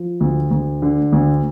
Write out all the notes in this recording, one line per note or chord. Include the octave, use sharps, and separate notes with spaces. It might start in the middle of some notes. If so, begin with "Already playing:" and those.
Already playing: F3
D2
D2
D3
D2